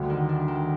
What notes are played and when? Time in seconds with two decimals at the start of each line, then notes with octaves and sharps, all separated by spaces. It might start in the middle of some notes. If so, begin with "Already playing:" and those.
Already playing: D2 D3 G3
0.10 D#3
0.29 D4
0.48 D#3